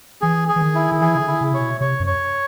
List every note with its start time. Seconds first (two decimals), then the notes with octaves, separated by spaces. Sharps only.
0.22 E3 G#4
0.48 G#4
0.56 E3
0.61 D#3
0.75 E4
0.92 D#3
1.01 E3 G#4
1.15 C#3
1.21 D3
1.28 E4
1.41 C#3
1.52 C3 C#5
1.61 B2
1.81 C3 C#5
2.00 F#2
2.07 C#5